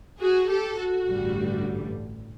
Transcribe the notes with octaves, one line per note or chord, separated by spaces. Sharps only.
F#4 G#4
G4 A4
F#4
A1 G2 D3 G3